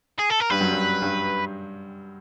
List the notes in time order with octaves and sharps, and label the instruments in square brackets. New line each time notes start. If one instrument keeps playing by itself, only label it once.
[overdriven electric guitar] G#4
A4
A#4
[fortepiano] G2 [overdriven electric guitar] B4
[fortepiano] F#2
G2
G2